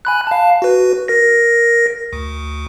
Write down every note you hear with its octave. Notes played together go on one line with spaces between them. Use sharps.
G#5 B5 F#6
F5 A5
F#4 B4
A#4 A#6
D2